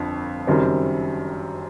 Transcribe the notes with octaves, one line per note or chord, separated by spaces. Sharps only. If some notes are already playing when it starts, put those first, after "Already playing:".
Already playing: G1 F2
F#1 F#2 D#3 G3 C4